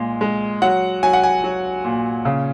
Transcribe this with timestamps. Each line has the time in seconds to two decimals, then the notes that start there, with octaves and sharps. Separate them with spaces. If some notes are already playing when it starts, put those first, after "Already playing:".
Already playing: A#2 G#3
0.21 G#3
0.62 F#3 F#5
1.03 F#3 G#5
1.13 F#5
1.23 G#5
1.44 F#3
1.85 A#2
2.25 C#3